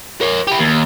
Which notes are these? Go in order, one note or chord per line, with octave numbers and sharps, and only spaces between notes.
A#4 C#5
E4 G4
D#2